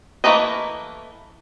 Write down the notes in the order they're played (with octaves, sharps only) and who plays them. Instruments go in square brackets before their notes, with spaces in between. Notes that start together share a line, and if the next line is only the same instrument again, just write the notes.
[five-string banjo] E3 A3 A#3 B4 D#5